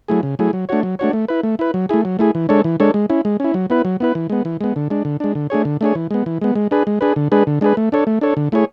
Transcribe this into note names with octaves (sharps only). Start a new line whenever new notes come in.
F#3 A3 E4 G#4
C#3
F#3 A3 E4 G#4
F#3
A3 D4 F#4 C#5
F#3
A3 D4 F#4 C#5
A3
E4 B4
A3
E4 B4
F#3
A3 E4 G#4
F#3
A3 E4 G#4
E3
G#3 D4 A4 C#5
E3
G#3 D4 A4 C#5
G#3
C#4 E4
G#3
C#4 E4
F#3
B3 E4 B4
F#3
B3 E4 B4
E3
G#3 B3
E3
G#3 B3
D3
G#3 D4
D3
G#3 D4
D3
A3 D4 G#4 C#5
D3
A3 D4 G#4 C#5
E3
G#3 B3
E3
G#3 B3
G#3
D4 G#4 B4
G#3
D4 G#4 B4
D3
G#3 D4 G#4 B4
D3
G#3 D4 G#4 B4
A3
D4 A4 C#5
A3
D4 A4 C#5
D3
A3 E4 G#4 C#5